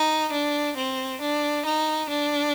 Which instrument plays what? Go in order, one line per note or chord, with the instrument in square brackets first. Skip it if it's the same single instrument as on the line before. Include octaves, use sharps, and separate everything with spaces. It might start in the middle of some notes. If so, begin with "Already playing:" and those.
Already playing: [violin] D#4
D4
C4
D4
D#4
D4